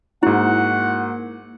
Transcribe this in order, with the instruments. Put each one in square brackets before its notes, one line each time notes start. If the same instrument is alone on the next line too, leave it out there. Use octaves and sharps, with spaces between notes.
[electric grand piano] G#2 F#4 [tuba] A#3 [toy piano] E4 [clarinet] F#5